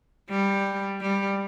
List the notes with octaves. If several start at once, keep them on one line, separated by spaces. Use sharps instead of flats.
G3
G3